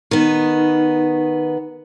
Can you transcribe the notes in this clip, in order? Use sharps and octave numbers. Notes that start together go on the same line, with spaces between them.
D#3 B3